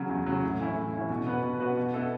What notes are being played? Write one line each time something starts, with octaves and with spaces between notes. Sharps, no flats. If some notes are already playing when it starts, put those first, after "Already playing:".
Already playing: C#3 F#3
E2
C#3 F#3
A2
E3 C#4 E4
A2
E3 C#4 E4
B2
B3 F#4 B4
B2
B3 F#4 B4
B2
B3 E4 A4